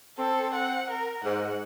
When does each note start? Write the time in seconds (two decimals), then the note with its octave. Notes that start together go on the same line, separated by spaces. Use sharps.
0.18 C4 A4
0.54 F#5
0.91 A#4
1.23 G#2 F#5